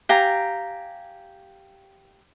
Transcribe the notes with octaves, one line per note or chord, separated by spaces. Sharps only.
G4 F5 G#5 A#5